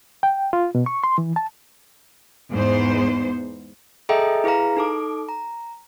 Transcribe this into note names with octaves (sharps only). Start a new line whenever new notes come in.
G5
F4
B2
C#6
C6
E3
A5
E2 G#2 B3 C5
G#4 A4 D#5 E5 G5 A#5
E4 G#4 B4 F5 A#5
D#4 A4 D6
A#5